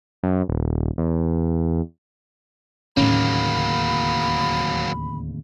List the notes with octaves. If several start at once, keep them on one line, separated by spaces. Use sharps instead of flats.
F#2
D#1
E2
D1 D#2 A2 C#3 F#3 A#3 C#4 B5